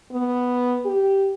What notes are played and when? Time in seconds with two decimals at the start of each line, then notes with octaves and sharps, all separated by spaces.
0.11 B3
0.85 G4